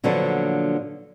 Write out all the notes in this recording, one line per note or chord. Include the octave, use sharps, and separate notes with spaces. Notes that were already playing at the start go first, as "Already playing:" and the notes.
A#2 D3 F3 F#3 B3 D4